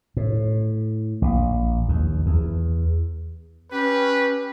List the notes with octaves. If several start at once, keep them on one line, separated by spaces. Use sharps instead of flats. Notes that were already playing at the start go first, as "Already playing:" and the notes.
A2
A#1
D#2
E2
C#4 G4 B4